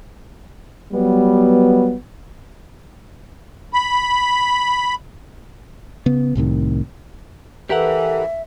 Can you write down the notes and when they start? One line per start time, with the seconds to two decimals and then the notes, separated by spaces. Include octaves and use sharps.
0.93 F#3 G3 B3
3.73 B5
6.06 C#3 B3
6.35 C2 A2 C3 D#3
7.70 E3 G4 A4 A#4 E5 F#5